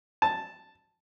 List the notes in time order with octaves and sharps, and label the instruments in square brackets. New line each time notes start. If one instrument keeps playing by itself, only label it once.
[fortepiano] A5